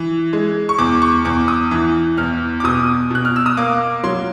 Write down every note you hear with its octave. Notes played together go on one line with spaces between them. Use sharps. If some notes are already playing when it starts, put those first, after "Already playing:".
Already playing: E3
G#3
C#6
E2 D6
C#6
E2 D6
D#6
E3
E2 F6
D6
B2 D#6
B2 F#6
F6
E6
D#6
A#3 D6
F#3 C6